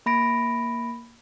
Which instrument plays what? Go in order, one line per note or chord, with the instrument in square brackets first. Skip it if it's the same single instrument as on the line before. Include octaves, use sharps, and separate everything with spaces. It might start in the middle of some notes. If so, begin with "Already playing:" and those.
[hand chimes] A#3 B5 A#6 D7